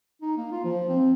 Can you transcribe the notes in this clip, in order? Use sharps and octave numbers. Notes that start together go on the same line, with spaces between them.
D#4
A#3
F4
F3
C4